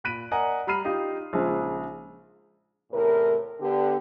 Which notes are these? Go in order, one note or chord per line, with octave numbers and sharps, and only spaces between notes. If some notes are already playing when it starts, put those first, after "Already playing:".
A#2 B5 F#6 B6 D7 D#7
A#4 D5 D#5 F#5 G#5 A#5
G3 A#5 B5 F6 C7 D#7
D#4 F4 G4 D#5
A#1 C#3 F3 G#3 D#4
E2 A2 C3 A#4
D3 B3 G4